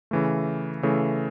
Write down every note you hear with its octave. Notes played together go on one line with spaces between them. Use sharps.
C#3 E3 A3
C#3 E3 A3